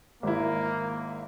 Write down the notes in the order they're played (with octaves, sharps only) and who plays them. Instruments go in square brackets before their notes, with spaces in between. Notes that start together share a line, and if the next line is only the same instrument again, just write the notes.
[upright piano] G#1 E4 [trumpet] A#3